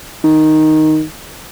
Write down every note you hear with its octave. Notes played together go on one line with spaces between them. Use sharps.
D#3